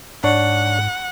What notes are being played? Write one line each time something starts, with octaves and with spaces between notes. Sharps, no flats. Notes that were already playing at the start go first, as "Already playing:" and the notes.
G#2 D4 C#5 D5 F#5